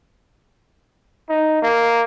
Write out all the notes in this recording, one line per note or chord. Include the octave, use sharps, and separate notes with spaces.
D#4
A#3